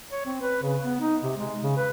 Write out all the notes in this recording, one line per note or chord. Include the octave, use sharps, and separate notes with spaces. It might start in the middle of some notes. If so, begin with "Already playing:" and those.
C#5
C4
B4
C#3
B3
D#4
C3
G#3
C#3
B4